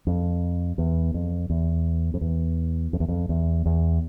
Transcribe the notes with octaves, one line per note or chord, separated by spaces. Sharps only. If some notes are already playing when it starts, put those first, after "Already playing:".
F2
E2
F2
E2
F2
E2
F2
E2
F2
E2
E2